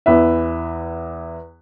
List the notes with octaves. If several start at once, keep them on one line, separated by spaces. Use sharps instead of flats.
E2 E3 B4 E5